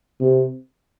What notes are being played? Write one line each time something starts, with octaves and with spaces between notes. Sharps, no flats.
C3